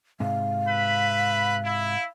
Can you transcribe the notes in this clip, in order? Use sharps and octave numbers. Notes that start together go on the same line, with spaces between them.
G#2 C3 F5
B4 E5 B5
E4